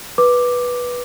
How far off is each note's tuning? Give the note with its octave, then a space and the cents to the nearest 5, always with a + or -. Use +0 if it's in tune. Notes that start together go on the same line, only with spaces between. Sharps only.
B4 -10 D6 +5